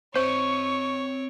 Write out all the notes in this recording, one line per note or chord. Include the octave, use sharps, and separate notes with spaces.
C4 C5 C#5 D#5 C#6